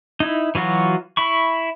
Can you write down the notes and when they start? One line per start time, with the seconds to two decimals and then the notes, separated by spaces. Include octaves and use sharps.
0.20 D#4 E4
0.55 E3 F#3 F4 F#4
1.17 E4 B5 C#6